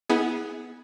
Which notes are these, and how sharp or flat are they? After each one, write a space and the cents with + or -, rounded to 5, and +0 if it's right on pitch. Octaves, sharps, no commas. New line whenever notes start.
B3 +0 E4 -30 G#4 +0